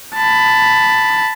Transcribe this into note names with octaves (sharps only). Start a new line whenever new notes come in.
A5 B5